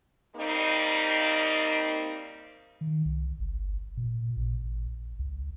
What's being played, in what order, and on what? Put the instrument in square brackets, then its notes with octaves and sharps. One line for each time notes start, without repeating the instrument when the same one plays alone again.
[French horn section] G3 A#3 C4 D#4
[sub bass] D#3
C2
G1
A#2
A1
C#2